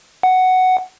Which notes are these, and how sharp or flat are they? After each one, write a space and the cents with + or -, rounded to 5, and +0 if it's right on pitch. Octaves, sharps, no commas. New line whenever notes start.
F#5 +5